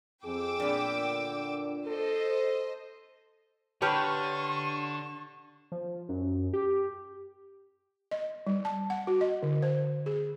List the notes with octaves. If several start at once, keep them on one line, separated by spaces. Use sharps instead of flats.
F2 G#4 G5 D6 E6
A#2 B3 D4
D3
A4 C5 D#5
D3 G4 B4 C#5 A5 C#6 F6
F3
F#2
G4
D#5
G3
A5
F#5
F#4
D#5
D3
C5
G#4